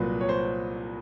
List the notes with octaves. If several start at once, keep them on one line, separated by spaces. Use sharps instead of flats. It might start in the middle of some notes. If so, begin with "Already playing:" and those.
Already playing: C2 A#2 F#3 B4
C#5
C5